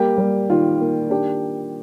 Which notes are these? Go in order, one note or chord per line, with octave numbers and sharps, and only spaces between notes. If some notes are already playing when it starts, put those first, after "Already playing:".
Already playing: G3 A#3 G4
G3
D#3 F4
A#3
D4 G4